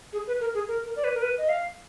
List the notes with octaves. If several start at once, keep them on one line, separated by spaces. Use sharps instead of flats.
G#4
B4
A#4
G#4
A#4
A#4
D5
B4
A#4
B4
D#5
F5